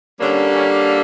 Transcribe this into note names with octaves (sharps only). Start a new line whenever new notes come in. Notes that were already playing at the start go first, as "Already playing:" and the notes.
D3 G3 A#3 C#4 D4
C#4